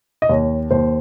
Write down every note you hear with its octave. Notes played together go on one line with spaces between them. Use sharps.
D#5
D#2 C#5
D#2 C5